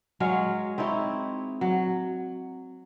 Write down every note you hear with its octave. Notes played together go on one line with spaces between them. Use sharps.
F#3 G#3 C#5 F5
C4 D#4 E4 C#5
F#3